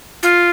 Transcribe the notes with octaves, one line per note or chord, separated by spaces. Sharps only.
F4